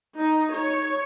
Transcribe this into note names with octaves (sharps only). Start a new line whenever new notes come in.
D#4
C#5